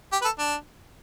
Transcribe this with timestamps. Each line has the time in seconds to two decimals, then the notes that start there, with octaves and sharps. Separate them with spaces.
0.12 G4
0.21 B4
0.25 A4
0.39 D4